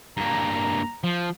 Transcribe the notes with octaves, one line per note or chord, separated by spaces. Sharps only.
G2 A#3 A#5
F3